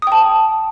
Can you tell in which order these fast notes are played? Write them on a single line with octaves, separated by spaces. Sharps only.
D#6 G5 A5